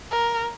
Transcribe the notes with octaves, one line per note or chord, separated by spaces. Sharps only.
A#4